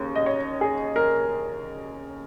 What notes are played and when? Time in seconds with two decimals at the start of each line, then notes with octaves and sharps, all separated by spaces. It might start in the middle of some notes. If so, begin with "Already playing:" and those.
Already playing: D#2 C#3
0.16 D#5
0.26 C#5
0.61 G#4
0.96 A#4